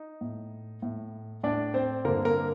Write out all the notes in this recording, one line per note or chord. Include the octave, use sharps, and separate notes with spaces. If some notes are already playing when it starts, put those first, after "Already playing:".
Already playing: D#4
A2
A2
A2 D4 D5
C4 C5
G2 D3 A#3 A#4
A#3 A#4